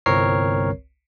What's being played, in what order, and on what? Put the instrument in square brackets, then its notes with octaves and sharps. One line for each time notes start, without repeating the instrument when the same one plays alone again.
[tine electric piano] G1 C2 C4 A#4 C#5 C7